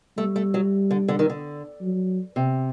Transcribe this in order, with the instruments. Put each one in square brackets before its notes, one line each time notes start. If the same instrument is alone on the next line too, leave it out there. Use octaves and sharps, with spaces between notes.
[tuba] G3 [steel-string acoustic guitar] A3
[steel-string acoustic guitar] A3
F#3
D3
D3
D#3
D3
[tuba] F#3
[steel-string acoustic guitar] C3